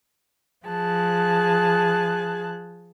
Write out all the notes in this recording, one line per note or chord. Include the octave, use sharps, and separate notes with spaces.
F3 G#4 A5 F#6